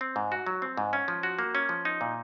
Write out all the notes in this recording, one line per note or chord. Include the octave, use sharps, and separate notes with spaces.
C4
G#2
F#4
F#3
C4
G#2
C#4
F3
F#4
A#3
C#4
F3
D#4
A#2